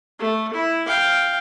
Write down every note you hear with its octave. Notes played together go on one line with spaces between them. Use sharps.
A3
E4
F5 G5